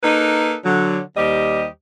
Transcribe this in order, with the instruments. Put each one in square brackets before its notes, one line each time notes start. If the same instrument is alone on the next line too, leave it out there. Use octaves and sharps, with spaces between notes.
[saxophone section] A#3 D#4 A4 B4
D3 F#3
D#2 G3 G4 C5 D#5